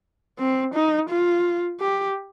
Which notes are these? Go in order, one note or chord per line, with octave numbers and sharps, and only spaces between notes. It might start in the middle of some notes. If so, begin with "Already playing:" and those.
C4
D#4
F4
G4